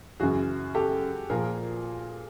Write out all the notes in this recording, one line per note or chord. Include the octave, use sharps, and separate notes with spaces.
F#2 C#3 E3 F#4 G#4
G4 A4
A#2 F3 A#3 G#4 A#4